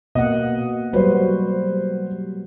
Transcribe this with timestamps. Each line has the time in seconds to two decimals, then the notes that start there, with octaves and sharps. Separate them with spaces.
0.15 B2 A#3 D#5 F#5
0.93 F#3 G3 F#4 B4 C5